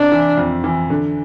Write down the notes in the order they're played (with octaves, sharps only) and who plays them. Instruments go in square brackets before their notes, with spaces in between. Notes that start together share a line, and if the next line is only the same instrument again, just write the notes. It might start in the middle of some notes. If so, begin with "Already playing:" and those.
Already playing: [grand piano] C3 [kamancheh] D4
[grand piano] E3
F2
E3
D3